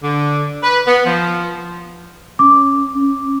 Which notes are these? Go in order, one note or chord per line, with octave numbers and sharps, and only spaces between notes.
D3
B4
B3
F3
C#4 D6
C#4